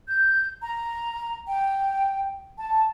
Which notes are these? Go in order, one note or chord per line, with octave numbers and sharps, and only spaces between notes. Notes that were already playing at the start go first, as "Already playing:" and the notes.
G6
A#5
G5
A5